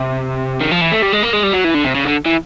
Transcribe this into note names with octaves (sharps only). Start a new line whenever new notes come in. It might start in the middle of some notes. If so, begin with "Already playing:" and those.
Already playing: C3
D#3
F3
E3
A3
G3
G#3
A#3
G#3
G3
F#3
E3
D3
C3
C#3
D3
E3